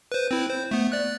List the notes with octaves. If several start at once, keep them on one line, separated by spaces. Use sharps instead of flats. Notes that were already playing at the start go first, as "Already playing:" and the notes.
B4 C5
C4 E4
C5
A3 B3
D5 F#6